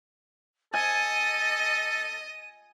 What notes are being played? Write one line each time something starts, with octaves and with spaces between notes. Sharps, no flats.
A4 D#5 G#5 D#7